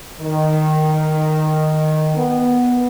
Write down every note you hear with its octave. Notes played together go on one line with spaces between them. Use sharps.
D#3
B3